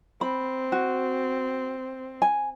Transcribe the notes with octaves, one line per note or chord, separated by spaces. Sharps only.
C4 B5
F#4
G#5